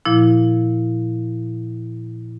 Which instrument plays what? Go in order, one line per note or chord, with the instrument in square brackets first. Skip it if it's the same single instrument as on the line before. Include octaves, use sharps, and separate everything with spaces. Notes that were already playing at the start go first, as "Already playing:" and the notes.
[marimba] A#2 F3 E4